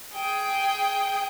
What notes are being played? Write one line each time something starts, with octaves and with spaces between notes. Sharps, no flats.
G#4 G5